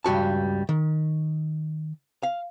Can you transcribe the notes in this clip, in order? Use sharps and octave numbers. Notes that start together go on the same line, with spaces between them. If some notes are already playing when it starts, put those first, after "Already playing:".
C#2 G2 G3 F#4 A5
D#3
F5